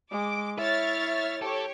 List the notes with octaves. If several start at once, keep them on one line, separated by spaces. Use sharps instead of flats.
G#3 D6
E4 C#5 E5 F6 A6
G4 A4 C#5